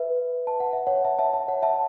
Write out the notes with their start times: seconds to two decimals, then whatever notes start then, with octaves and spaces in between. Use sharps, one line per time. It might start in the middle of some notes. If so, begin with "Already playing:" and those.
Already playing: B4 E5
0.47 A5
0.60 F#5
0.73 E5
0.87 C#5 F#5
1.04 E5 A5
1.19 E5 A5
1.33 E5 A5
1.48 C#5 F#5
1.63 E5 A5